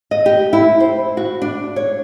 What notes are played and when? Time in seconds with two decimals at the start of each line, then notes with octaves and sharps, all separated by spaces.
0.11 D#5
0.26 G4
0.53 E4
0.80 C5
1.17 F#4
1.42 D4
1.76 C#5